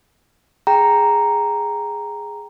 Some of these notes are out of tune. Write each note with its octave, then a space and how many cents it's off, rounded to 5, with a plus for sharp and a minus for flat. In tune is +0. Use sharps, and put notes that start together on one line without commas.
G#4 +0 G5 +0 A#5 +0